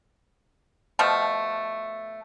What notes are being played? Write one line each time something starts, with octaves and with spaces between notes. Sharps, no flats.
B2 F3 A3